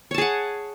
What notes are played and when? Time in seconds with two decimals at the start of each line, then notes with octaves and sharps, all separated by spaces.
0.11 C#5
0.14 A5
0.18 G#4
0.21 F#5